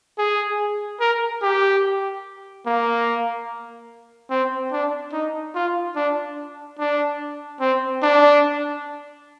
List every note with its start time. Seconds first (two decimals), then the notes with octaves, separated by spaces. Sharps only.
0.18 G#4
1.00 A#4
1.42 G4
2.66 A#3
4.30 C4
4.72 D4
5.13 D#4
5.55 F4
5.96 D4
6.79 D4
7.60 C4
8.02 D4